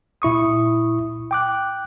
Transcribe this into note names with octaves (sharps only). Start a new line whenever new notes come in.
A#2 E4 C#6 D#6
G5 D6 F#6